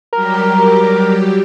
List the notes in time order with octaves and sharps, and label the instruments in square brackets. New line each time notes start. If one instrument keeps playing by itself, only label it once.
[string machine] F#3 G3 G4 [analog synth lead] A#4